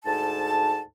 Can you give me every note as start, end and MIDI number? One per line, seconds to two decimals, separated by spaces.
0.04 0.80 38
0.04 0.80 44
0.04 0.80 81